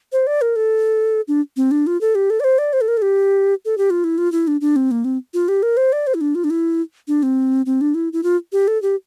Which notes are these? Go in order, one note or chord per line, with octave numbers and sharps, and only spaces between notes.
C5
D5
A#4
A4
D4
C4
D4
F4
A4
G4
A4
D5
C5
D5
C5
A4
A#4
A4
G4
A4
G4
F4
E4
F4
E4
D4
D4
C4
A#3
C4
F4
G4
A#4
C5
D5
C5
E4
D4
F4
D4
E4
D4
C4
C4
D4
E4
E4
F4
G4
A4
G4